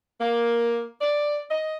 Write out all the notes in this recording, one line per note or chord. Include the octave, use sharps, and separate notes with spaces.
A#3
D5
D#5